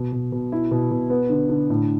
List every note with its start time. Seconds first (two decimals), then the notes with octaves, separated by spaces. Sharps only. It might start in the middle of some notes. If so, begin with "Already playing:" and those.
Already playing: B2
0.12 B2
0.32 B2
0.52 E4
0.71 B2
0.91 B2
1.10 B3
1.30 D3
1.50 D3
1.70 A2